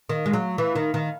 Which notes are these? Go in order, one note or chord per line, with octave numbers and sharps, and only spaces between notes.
D#3
G#3
F#3
E3
D#3
D#3